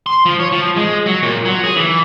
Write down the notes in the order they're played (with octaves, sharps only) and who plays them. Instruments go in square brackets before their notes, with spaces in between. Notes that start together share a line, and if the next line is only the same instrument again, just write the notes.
[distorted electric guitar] C6
F3
C#5
F3
G#3
F#3
A#2
F#3
G#4
E3